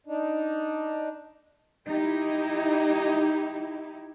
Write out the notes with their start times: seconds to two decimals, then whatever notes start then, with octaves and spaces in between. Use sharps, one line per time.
0.07 D4 D#4
1.88 D#4 E4 G4